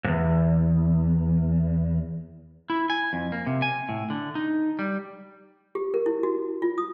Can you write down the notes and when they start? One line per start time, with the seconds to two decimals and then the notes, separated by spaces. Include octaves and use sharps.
0.05 E2 G#2
2.70 E4
2.90 G#5
3.13 F2
3.32 A#3
3.47 C3
3.62 G#5
3.89 A2
4.10 D3
4.35 D#4
4.79 G3
5.75 G4
5.94 A#4
6.06 E4
6.23 F#4
6.62 F4
6.78 D#6